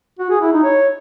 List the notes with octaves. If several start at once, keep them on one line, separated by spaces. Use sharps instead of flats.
F#4
G#4
E4
D#4
C#5